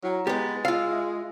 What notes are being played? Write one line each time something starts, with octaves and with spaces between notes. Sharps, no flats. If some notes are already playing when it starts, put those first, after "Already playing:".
F#3 E4 F#5 A#5
G#3 B3 G4 A6
F4 F5 E6
E5